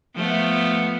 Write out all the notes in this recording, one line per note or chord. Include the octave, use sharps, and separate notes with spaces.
F3 A3 B3